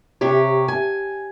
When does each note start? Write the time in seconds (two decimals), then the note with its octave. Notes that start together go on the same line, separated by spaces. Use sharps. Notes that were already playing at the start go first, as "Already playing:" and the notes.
0.21 C3 G4 C#5
0.68 G#5